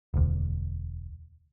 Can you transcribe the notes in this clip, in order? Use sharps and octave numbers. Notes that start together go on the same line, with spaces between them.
E1 D2